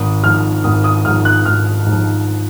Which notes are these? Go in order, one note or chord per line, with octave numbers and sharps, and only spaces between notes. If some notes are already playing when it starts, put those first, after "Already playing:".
Already playing: G#1 D#6
G#2 F3 F6
G#1 D#6
D#6
G#2 F3 F6
F#6
G#1 F6
G#2 F3